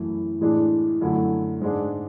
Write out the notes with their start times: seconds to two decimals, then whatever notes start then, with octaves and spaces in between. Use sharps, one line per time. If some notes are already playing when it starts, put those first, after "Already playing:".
Already playing: F#2 E3 A3 E4
0.41 A2 E3 G#3 D4
1.01 F#2 D3 A3 E4
1.61 G#2 G#3 D4